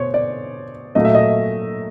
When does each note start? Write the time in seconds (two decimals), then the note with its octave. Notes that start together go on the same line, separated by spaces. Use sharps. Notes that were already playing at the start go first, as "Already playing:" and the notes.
Already playing: B2 C5 C#5
0.14 D5
0.95 A#2 F#3 A3 D#5
1.05 E5
1.15 D#5